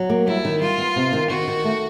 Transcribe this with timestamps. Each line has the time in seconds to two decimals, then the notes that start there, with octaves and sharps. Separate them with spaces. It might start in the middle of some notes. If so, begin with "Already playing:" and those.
Already playing: F#3
0.10 A#3
0.27 G3 E4
0.45 D#3
0.61 G3 F4
0.78 B3
0.96 C3
1.13 D#3
1.30 D#3 F#4
1.48 D#3
1.64 A3